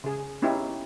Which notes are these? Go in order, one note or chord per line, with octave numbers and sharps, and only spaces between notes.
C#3 G#4
B3 C#4 D#4 E4 G4